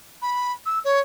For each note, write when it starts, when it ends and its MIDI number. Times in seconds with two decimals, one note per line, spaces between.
0.22 0.53 83
0.66 0.79 88
0.85 1.01 73